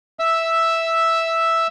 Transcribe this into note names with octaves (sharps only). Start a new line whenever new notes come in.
E5 E6